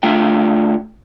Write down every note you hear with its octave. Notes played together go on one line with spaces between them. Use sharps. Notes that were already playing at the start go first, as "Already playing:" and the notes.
D3 A3 F4 G5